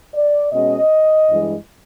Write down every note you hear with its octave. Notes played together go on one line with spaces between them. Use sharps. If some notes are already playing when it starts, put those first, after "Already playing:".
D5
B2 G#3 C#4 D#5
G2 E3 G#3